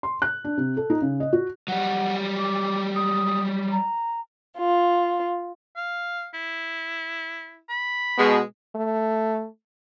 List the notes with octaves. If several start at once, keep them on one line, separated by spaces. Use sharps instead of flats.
C6
F#6
D4
C3
A4
D#4
C#3
D#5
F#4
F#3 G3 F#5
D6
D#6
A#5
F4
F5
E4
B5
B2 G#3
A3